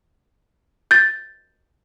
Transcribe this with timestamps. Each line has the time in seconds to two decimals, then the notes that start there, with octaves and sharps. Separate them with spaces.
0.91 G6 A6